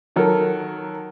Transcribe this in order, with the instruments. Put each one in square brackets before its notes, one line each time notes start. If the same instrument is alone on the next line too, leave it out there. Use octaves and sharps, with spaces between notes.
[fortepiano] D#3 F#3 A4 A#4